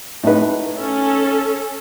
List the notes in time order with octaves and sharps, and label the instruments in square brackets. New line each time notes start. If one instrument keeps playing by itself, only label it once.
[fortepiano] A2 D#4 B4
[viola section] C#4 A4